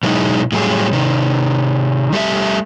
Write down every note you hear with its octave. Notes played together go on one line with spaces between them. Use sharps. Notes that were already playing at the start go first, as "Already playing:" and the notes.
B2 F#3 G#3 D#4 E4
A2 F#3 G3 G#4
C3 D#3
G3 A3 G4 E5